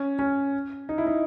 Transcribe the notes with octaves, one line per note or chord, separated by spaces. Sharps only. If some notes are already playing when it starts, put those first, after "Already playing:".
Already playing: C#4
C#4
D#4
E4
D#4